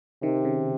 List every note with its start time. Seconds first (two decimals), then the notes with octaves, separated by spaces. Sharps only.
0.23 C3 D#3
0.45 C#3